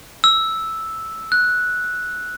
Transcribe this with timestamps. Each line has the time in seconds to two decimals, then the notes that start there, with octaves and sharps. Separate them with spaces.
0.24 E6
1.32 F#6